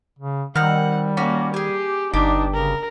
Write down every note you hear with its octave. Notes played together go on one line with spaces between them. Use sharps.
C#3
D#3 G3 C4 F#5 F6
A#3 C#4 F#4 D5
G4 G#4 G#5
G1 D4 D#4 G4
C#3 A#4